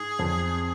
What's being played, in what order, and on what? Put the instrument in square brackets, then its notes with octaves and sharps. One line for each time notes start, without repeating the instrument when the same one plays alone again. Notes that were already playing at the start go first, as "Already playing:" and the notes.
Already playing: [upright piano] G#2 [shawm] G#4
[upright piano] F2